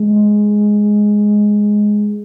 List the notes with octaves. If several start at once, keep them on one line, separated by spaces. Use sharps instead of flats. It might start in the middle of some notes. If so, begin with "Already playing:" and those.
Already playing: G#3